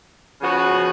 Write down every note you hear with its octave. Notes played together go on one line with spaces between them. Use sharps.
C#3 F3 B3 F#4